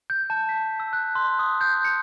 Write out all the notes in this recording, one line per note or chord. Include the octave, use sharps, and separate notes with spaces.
G6
A5
B6
E6
F#6
C6
D#6
G6
C#7